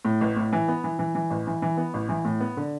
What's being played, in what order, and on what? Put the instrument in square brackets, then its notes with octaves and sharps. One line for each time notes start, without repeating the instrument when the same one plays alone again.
[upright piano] A2
A1
A2
E3
B3
E3
E3
E3
A1
E3
E3
B3
A1
E3
A2
B3
D3